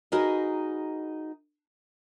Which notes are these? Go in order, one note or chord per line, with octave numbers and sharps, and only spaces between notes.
D#4 F#4 G#4 A#4 B4 D#5